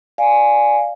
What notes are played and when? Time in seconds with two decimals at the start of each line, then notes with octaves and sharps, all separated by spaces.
0.18 D5 F5 G#5